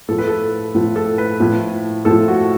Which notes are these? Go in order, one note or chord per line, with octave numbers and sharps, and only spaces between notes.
A2 F3 A4
B4
A4
A2 F3
A4
B4
A2 F3
A2 F3 A4
F#4